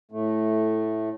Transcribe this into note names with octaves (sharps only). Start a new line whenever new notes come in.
A2 A3